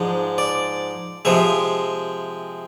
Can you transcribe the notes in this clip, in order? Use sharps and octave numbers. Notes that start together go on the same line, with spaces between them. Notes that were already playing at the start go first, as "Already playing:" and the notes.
Already playing: G#2 F3 G#3 D4
D5
C3 F3 G#3 E5